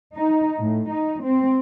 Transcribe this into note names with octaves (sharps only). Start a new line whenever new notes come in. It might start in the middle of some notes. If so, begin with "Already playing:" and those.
D#4
A2
D#4
C4